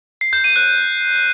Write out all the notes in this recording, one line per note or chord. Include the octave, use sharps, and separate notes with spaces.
C7
G6
D#7
F#6